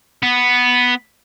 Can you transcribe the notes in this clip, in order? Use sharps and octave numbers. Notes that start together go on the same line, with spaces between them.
B3